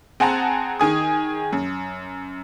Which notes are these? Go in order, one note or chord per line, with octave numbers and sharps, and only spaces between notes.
C4 G#4 F#5 A5 A#5
D#3 G#4 D#6
F#2